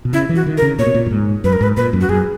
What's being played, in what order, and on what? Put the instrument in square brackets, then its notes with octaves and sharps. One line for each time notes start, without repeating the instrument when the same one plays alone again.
[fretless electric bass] B2
[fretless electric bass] C#3 [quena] E4
[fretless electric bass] E3
[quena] F#4
[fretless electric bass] D#3
[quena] A#4
[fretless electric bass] C#3
[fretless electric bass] A#2 [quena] C#5
[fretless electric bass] B2
A#2
F#2
G#2
[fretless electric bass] F#2 [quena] B4
[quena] A#4
[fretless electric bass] G#2 [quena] B4
[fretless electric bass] A#2 [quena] B4
[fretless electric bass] F#2
[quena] F#4
[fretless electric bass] F#2 [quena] G#4